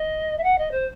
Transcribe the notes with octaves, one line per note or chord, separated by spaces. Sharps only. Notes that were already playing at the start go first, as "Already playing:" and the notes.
Already playing: D#5
E5
F#5
D#5
C5